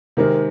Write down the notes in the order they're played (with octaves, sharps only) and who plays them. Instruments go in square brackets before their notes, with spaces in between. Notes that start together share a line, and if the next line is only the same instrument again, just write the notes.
[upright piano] C3 D#3 G#3 C4 [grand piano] A#4